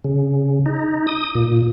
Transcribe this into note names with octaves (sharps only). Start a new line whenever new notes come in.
C#3
D#4
D#6
A#2